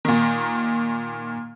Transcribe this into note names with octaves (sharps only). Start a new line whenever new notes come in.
A#2 D#3